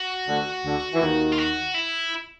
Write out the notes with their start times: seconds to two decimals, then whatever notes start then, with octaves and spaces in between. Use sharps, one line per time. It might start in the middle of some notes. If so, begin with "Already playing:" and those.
Already playing: F#4
0.28 D2 D3
0.65 D2 D3
0.94 E3
1.02 D#2 D#3
1.32 F4
1.38 F#4
1.74 E4